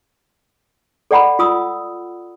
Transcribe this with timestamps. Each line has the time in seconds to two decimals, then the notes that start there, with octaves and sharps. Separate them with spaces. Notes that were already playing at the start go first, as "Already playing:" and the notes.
1.11 A4 D5 F#5 A#5 B5
1.39 F4 D#6 E6